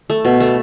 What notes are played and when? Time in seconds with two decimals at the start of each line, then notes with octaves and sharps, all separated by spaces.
0.10 A3
0.25 B2
0.40 A3